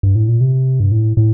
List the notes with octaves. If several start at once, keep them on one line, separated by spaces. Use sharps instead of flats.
G2
A2
A#2
C3
G2
A2
A2